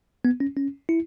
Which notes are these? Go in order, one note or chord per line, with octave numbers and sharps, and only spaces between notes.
B3
C#4
C#4
E4